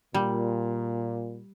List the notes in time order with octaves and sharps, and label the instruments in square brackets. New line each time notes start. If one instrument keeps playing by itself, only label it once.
[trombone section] A#2 [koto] G3